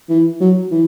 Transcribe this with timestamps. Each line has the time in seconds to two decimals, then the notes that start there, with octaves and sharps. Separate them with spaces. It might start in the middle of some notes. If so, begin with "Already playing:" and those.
0.09 E3
0.41 F#3
0.72 E3